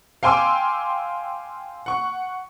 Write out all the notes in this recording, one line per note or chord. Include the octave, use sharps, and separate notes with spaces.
F5 G5 G#5 C6 D6 E6
F#5 C#6